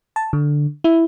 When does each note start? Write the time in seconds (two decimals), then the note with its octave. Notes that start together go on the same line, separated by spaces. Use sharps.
0.16 A5
0.33 D3
0.84 E4